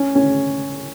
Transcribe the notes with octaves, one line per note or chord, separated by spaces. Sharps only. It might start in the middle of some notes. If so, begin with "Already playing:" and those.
Already playing: C#4
C#4